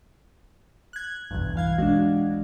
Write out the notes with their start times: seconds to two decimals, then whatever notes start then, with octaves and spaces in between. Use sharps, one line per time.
0.93 F#6 G#6
1.31 B1 E2 G2
1.55 E3 F5 G#6
1.78 B1 G#3 D4 F#4